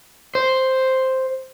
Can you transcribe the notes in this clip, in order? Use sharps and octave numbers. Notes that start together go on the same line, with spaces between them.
C5